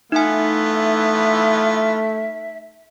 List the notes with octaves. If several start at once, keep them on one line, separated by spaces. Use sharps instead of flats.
E3 A3 B3 D#4 F4 E5 G#5